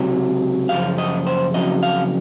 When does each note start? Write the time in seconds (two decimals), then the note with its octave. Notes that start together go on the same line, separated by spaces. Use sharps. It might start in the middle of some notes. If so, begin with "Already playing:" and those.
Already playing: C#2 C3 F#3
0.69 F#2 C#3 F3 F5
0.98 D#5
1.26 C5
1.54 F2 C#3 F#3 D#5
1.83 F5